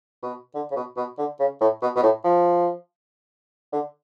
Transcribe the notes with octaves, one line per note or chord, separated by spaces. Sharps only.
B2
D3
C#3
B2
B2
D3
C#3
A2
B2
B2
A2
F3
D3